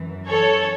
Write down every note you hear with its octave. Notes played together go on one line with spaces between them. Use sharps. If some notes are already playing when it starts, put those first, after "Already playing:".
Already playing: F#2 E3
A4 C#5